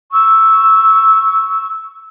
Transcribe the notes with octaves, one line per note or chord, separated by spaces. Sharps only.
C#6 E6